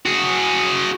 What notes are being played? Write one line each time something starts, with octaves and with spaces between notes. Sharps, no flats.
F#4 G#4